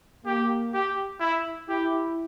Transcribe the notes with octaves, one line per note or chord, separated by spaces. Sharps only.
A#3 G4
G4
E4
E4 G4